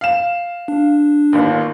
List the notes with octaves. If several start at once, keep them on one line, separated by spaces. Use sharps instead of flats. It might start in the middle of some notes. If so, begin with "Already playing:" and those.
F5 E7
D4
G1 D#2